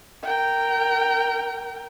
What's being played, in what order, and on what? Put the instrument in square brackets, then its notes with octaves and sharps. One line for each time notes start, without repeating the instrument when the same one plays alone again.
[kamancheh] A#4 G5